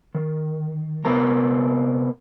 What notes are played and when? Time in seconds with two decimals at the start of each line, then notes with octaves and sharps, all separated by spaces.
0.15 D#3
1.05 C3 A#3 B3 A#4 A#5